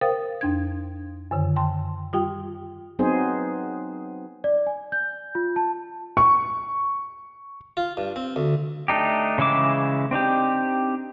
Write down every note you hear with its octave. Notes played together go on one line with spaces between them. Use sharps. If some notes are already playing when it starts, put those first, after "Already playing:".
A#4 C5 F5 G5 D#6 A6
F2 D4 G#6
F#2 D3 D#3
G5 A5 C6
G3 F4 G4 G5
F#3 B3 C4 D#4 G#4 C5
D5
G#5
G6
F4
A5
C#6
F4
G2
C4
D2
A3 D4 D#4 G4
C#3 E3 G#3 E5 D6
C4 D4 D#4 G4